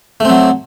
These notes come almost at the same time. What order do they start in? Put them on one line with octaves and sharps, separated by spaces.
A3 C4 F#3